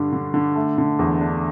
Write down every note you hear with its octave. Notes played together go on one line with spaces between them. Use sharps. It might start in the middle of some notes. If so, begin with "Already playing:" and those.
Already playing: G2 D3
D3
D3
A3
D3
E2
D4